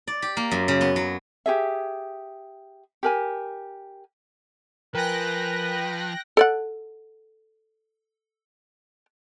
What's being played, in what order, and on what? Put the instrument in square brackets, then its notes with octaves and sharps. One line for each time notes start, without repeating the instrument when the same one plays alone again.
[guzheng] D5
G4
A#3
F#2
C#3
B3
F#3
[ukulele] G4 G#4 E5
G4 A#4 G#5
[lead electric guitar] F3 [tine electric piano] A#4 G#5 [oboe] B4 [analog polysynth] G5 F#6 A#6
[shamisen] A4 D5 F#5